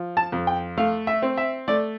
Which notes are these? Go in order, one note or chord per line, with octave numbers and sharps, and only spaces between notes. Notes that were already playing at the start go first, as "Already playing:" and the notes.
Already playing: F3
A5
F2
G5
A3 F5
E5
C4
E5
A3 D5